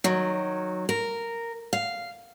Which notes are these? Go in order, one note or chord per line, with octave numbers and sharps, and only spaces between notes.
D#3 F#3
A#4
F5